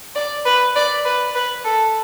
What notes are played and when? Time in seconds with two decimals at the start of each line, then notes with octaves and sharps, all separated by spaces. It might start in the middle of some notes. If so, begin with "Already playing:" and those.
0.15 D5
0.45 B4
0.76 D5
1.05 B4
1.35 B4
1.64 A4